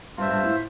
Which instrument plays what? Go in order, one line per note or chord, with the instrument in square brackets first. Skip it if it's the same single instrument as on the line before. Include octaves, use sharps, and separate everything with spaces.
[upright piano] G2 [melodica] F4 C5 E5
[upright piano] G2
A2